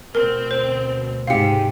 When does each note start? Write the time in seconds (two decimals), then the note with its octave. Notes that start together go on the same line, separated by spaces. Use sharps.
0.15 D2 B2 C4 A#4
0.51 C5
1.27 G#2 C3 G4 F5 C#7